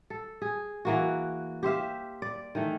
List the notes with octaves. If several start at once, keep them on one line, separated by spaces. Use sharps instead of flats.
A4
G#4
E3 A#3 F#4
G4 C5 E5 F5
D5
D#3 E3 A3